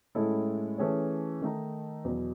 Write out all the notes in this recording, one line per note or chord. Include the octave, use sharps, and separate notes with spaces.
A2 G#3 C#4 E4 A4
E3 A3 C#4 G#4 C#5
D#3 A3 D#4
E2 B2 F#3